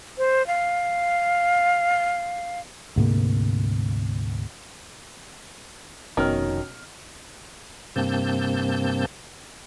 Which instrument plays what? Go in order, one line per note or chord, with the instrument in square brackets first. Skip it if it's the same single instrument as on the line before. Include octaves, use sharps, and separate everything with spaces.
[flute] C5
F5
[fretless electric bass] D2 G#2 C3 A#3
[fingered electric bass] F1 [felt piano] B2 C#4 F6 [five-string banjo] D#3
[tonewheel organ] G2 C3 A#3 C4 A5 G6